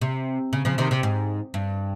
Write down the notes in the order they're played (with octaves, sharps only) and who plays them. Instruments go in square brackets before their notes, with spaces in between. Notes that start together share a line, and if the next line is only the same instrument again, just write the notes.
[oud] C3
C#3
C#3 F3
C3 D#3
C3
G#2
G2